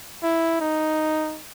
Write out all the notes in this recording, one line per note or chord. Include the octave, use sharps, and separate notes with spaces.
E4
D#4